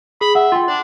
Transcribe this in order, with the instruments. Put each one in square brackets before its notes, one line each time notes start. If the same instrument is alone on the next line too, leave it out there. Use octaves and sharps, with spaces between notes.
[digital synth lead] G#4 [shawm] B5
[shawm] E5 [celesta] F#5
[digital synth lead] F4 [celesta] G5 C6
[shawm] D4 [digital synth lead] D5